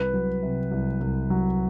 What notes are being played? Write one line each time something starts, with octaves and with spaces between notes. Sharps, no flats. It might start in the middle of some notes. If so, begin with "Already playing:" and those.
Already playing: C2 B4
F#3
C3
C2
C2
F#3